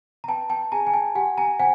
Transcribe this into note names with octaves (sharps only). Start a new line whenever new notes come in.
A#5
B4 G5 A5
G5 A5
G#4 G#5 A#5
G#5
G5 A5
G4 F#5 G#5
G#5 A#5
C5 F#5 G#5